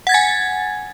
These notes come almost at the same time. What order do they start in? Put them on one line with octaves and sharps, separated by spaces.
F#5 G#6 A6 G#5